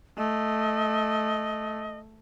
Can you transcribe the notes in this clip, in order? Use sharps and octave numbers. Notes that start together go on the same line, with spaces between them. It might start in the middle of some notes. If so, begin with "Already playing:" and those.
A3 D#5